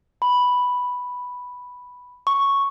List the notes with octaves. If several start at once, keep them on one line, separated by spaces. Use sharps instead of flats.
B5
C#6